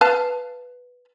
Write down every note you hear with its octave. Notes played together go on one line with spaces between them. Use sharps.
B4 F5 A5